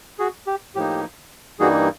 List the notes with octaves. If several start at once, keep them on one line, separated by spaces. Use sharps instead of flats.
F#4 G#4
G4
A2 F3 A#3 D#4 G4
G2 E3 G3 A#3 D#4 F#4 G#4